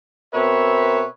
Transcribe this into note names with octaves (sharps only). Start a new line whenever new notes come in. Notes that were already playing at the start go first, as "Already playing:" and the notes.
B2 C4 A#4 B4 C#5 E5